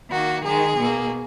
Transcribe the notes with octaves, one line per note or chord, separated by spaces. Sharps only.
D#3 A#3 F#4
D#3 G#3 G#4
B2 A#3